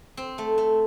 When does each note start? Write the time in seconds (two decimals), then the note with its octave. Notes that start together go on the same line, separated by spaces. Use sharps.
0.17 C4
0.38 A3
0.58 A3